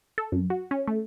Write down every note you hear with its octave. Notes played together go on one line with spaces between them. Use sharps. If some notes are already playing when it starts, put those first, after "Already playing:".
A4
F#2
F#4
C#4
A3